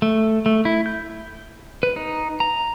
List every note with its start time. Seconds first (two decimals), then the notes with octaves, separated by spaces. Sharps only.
0.02 A3
0.46 A3
0.65 E4
0.86 G6
1.83 B4
1.96 D#4
2.40 A#5